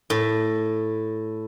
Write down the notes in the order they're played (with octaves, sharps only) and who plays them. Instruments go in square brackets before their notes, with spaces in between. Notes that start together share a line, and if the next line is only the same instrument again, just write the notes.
[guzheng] A2